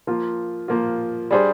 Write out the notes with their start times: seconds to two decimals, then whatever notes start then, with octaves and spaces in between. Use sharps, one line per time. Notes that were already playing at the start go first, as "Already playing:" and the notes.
0.07 F3 A#3 F4
0.68 F3 A#3 F4
1.31 G3 D4 G#4 C5